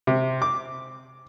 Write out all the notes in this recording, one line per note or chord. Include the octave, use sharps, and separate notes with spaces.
C3
D6